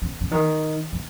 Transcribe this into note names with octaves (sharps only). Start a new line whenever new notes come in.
C#3
C#3
D#3
D#3